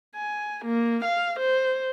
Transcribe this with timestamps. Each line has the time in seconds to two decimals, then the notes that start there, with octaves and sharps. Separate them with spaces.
0.15 G#5
0.65 A#3
1.05 F5
1.39 C5